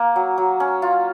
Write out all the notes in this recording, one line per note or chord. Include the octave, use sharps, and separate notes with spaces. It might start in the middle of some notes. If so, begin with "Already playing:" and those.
Already playing: A#3 F#5 A#5
F#3
F#3
C#4
F4